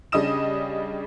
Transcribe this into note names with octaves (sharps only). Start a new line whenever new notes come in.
C#3 G3 D4 D#5 D#6 E7